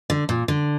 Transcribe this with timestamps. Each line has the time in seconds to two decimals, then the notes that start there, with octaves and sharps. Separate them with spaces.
0.10 D3
0.29 A#2
0.48 D3